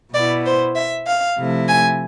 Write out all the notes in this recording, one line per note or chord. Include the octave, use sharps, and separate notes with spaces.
B2 B3 E4 D5
C5
E5
F5
C3 F3 A3 E4
G#5